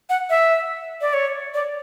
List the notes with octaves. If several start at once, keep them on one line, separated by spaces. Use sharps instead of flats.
F#5
E5
D5
C#5
D5